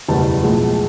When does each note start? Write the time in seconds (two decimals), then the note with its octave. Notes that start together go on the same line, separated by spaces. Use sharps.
0.08 F#1 E2 B2 G3 A5
0.42 B1 A2 F3 G#3